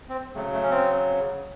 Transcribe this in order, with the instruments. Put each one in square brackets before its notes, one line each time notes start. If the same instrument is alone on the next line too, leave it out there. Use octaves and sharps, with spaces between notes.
[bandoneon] C4
C#3 F#3 A3
A3
C#4
C4